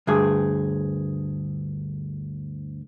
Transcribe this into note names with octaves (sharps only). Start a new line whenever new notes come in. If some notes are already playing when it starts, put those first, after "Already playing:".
D2 G2 G#4